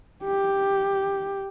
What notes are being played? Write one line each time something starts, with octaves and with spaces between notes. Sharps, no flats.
G4